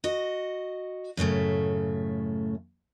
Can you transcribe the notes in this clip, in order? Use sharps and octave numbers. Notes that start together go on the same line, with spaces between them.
F#4 D#5
F#2 A2 C#3 A3